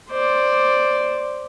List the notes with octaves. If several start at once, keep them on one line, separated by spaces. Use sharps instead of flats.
C5 D5